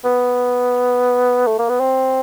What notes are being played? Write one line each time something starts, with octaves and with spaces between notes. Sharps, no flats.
B3
A3
A#3
B3
C4